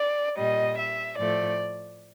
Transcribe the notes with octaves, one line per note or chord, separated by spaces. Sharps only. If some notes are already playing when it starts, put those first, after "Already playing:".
Already playing: D5
A#2 G3 D#5
E5
A2 F3 A3 D5